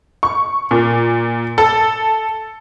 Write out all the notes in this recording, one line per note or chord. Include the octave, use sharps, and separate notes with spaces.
C#6
A#2
A4